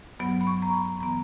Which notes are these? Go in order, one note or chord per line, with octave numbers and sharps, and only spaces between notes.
G2 F#3 B3 B5
B5
C#6
A#5
B5
E3 B3 A#5